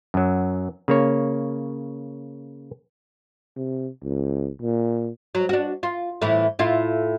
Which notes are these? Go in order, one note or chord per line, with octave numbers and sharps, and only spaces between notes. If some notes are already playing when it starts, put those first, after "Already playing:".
F#2 F#3
C#3 A#3 C#5
C3
C#2
A#2
F#3
D4 F#4
F4
A2 E3 E4
A2 E4 F4